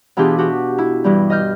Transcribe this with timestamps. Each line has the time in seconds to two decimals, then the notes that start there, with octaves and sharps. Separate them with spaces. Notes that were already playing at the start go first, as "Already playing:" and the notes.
0.17 B2 E3 D4 F4 G4 G#4
0.38 F#4 G4
0.78 E4
1.04 G2 E3 G3
1.30 D#5 F6 G6